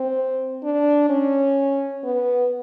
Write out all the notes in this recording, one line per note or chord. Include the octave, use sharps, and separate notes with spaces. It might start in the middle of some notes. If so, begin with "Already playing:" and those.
Already playing: C4
D4
C#4
B3